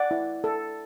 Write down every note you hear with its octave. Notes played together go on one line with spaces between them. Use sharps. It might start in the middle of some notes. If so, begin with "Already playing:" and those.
Already playing: D5 F#5
E4
A4